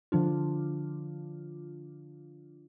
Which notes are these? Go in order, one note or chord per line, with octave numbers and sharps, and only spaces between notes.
D3 F3 D4 F4